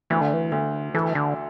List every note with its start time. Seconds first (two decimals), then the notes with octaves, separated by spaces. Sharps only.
0.10 D2 E3
0.21 D3
0.33 E3
0.52 D2 D3
0.94 E3 A4
1.15 D3